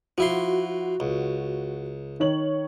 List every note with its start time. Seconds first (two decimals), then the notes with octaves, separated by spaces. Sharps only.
0.18 F3 E4 F#4 C6
1.00 C#2
2.20 D#3 C#5 F#7